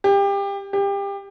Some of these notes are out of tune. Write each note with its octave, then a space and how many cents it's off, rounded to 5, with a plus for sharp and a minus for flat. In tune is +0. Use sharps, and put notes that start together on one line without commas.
G4 +25
G4 +25